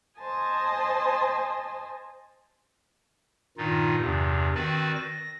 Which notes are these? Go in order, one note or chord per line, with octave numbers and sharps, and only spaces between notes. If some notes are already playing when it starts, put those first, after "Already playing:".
C5 D#5 G#5 A5
G2 A#2 D#3 D#4 F4
E2 G2 C3
D#3 C4 F#4 B4 D5
A#6